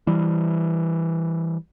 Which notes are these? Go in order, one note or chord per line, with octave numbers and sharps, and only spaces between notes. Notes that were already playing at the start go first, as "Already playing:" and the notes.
E3 G3